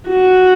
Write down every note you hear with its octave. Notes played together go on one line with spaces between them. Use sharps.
F#4